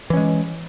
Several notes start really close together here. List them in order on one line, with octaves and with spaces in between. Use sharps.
E3 C#4 G#3